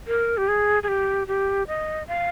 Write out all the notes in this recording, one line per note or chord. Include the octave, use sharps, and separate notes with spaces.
A#4
G4
G#4
G#4
G4
G4
D#5
F5